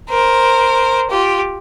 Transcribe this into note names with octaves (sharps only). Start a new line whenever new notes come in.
A#4 C5
F4 G4